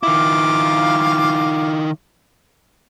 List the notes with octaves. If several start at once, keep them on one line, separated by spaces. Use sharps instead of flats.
D#3 E4 F4 F5 D6